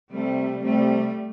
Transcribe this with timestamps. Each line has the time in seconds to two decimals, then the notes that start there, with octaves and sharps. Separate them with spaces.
0.12 C3 G3 A3
0.62 C3 G3 A3